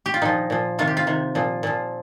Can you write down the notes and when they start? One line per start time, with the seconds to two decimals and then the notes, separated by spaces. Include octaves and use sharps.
0.06 G4
0.14 F4
0.22 A#2 F3 D#4
0.50 A#2 F3
0.79 C3 D#3 F4
0.87 G4
0.97 F4
1.07 C3 D#3
1.35 A#2 F3
1.63 A#2 F3